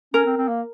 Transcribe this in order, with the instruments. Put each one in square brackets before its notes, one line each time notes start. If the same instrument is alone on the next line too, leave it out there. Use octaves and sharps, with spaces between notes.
[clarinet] C#4 [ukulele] A#4
[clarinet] C4
C4
A#3